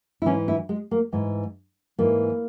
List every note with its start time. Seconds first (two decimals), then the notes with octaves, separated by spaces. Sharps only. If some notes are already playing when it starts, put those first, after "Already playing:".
0.22 E4
0.26 G#2 E3 C#4
0.48 E4
0.69 G#3
0.91 A#3
1.12 G#2 E3
1.99 G#2 E3 A#3